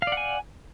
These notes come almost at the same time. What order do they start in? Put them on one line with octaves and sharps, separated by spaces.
F5 D5 F#5 G#5